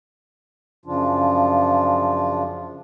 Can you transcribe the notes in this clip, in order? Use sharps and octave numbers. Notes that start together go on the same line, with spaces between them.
F#2 C#3 F3 D4 F4